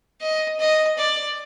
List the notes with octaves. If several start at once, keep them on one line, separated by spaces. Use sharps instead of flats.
D#5
D#5
D5